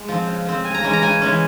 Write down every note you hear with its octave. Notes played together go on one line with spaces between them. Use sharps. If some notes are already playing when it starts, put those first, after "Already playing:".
Already playing: G#3
F3 C4
C#3
F3 C4
C#3 G#5
A#5
E3 G#3 C#4 G#5
A#5
C#3 G#5
E3 G#3 C#4